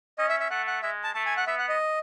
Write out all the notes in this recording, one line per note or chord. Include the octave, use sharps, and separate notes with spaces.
C#4 D#5
E5
E5
A3 F#5
F#5
G#3 E5
A5
A3 A5
G#5
F#5
B3 E5
F#5
D#5